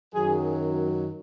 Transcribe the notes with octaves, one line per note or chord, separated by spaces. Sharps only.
F#2 D#3 F#3 G#4